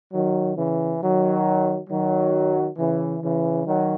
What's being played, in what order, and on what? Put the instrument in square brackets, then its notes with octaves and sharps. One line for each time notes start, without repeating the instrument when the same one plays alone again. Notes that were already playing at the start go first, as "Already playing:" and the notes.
[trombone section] D#3 F#3
C#3 E3
D#3 F#3
D#3 F#3
C#3 E3
C#3 E3
D#3 F#3